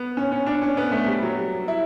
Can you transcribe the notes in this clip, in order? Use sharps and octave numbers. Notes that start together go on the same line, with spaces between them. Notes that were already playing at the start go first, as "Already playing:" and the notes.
Already playing: B3
C#4
C#4
D4
C#4
B3
A3
G3
F#3
E4